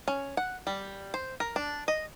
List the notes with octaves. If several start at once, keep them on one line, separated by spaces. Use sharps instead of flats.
C#4
F#5
G3
C5
A#4
D4
D#5